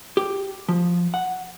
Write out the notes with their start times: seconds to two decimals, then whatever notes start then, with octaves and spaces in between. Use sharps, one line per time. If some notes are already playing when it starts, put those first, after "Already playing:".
0.17 G4
0.69 F3
1.14 F#5